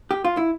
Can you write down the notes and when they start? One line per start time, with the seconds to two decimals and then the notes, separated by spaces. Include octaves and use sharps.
0.11 G4
0.25 F4
0.37 E4